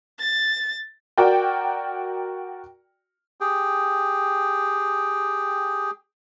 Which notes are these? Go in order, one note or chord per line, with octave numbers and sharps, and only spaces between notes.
A6
F#4 A#4 D5 G5
G4 G#4 G5